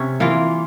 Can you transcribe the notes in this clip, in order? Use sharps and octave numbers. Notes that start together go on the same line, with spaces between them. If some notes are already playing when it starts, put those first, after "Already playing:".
Already playing: C3 C#4
E3 A#3 F4